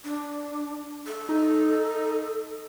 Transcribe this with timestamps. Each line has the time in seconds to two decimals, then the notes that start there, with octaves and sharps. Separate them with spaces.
0.04 D4
1.06 A4
1.29 D#4